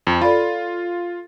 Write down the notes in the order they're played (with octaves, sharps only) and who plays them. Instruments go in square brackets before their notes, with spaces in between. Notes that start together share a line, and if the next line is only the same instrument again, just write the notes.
[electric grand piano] F2
[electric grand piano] F4 [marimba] A4 D5 B5